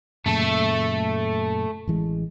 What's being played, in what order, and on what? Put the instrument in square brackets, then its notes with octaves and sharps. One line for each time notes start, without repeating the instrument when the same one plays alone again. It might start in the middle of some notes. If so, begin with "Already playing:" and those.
[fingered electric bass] F#2 A#2 C#3 [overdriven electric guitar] A3 A4
[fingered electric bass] A1 E3 G#3